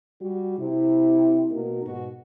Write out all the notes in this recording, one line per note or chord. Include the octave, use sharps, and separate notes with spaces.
G3 F#4
C3 E4
B2 A#3 D#4 F#4 A#4
G#2 B2 F#4